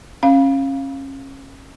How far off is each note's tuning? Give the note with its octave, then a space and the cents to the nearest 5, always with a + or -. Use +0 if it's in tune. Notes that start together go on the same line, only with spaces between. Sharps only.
C#4 -30 F5 +0